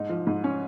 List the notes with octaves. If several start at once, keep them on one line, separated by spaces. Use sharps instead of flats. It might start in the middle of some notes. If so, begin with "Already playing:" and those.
Already playing: G#2 D#4
F3
G#2
C#4